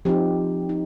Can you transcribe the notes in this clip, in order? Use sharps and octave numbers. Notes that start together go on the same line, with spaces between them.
F3 C4 D#4 G4
D#4